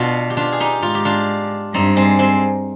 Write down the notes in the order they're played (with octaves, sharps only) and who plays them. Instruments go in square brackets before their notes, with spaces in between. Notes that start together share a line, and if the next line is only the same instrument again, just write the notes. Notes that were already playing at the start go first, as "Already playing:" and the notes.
Already playing: [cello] B2 [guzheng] B3 D4 F4
[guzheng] G4
D4 F4
G#4
D#4 G4
[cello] G#2 [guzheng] F4
[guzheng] G4
D4 F4
[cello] G2 [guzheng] C4 D#4
[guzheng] G#3 C4
G#3 C4